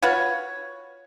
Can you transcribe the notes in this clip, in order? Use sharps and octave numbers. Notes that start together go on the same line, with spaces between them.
F4 F#4 B4 C#5